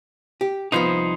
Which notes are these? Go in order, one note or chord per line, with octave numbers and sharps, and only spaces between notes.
G4
C2 F3 B3 D#4 C5